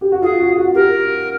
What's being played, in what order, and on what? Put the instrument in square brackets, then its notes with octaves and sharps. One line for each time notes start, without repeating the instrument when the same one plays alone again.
[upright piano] G4
F#4
[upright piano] F4 [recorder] G#4
[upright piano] F#4
F#4
[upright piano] G4 [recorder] A#4